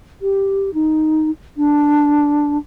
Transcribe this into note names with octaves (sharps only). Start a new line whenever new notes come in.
G4
D#4
D4